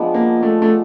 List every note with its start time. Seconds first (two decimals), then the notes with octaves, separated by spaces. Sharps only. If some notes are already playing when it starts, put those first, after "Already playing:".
Already playing: F3 G#3 B3 D4
0.14 A#3
0.43 A3
0.62 A3